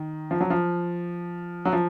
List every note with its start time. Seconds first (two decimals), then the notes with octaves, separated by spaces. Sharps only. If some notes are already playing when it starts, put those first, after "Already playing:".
Already playing: D#3
0.31 F3
0.40 F#3
0.50 F3
1.65 F#3
1.73 F3